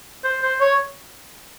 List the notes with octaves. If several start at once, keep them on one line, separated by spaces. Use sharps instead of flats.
C5
C5
C#5